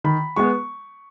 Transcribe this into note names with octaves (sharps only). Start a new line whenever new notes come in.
D#3 B5
G#3 B3 C#6